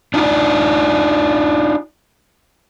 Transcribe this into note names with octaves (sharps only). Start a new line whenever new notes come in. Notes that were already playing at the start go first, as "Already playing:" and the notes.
D4 D#4 F4 D5